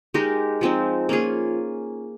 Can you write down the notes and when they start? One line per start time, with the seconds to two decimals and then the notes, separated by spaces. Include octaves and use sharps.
0.14 G#3 D#4 G4 A#4
0.61 F3 G#3 C4 D#4
1.09 A#3 C#4 F4 G#4